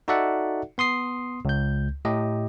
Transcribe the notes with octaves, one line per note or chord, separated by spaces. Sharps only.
D#4 F#4 A4 D5 E5 F#5
B3 C6 D#6 C7
C#2 G6
A2 G4 D#5